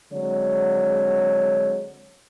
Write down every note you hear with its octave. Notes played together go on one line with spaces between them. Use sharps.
D3 F#3 G#3 C4 C#5